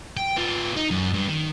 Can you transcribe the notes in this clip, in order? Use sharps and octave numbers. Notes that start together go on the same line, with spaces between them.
G5
B3 F4
D#4
F#2
G2
D#3